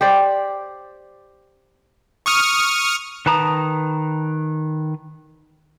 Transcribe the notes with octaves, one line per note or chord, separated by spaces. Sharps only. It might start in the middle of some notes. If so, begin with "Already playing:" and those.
G4 C5 D5
C#6 D#6 F6
D#3 B4 A5 A#5 D#6